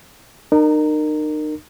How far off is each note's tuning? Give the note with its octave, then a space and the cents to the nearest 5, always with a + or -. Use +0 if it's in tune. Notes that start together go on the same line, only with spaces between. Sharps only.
D#4 -40 A#4 -10